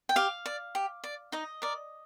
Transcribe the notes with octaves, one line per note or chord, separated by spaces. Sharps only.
G5
G4 F5
D5
G4
D5
D#4 D#5
A#4 D5